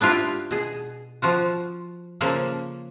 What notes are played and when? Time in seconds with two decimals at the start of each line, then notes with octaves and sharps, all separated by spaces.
0.01 B3 D4 E4 F4 G4
0.51 B2 G#4
1.22 F3 F4 F#4
2.21 C#3 F3 A#3 A4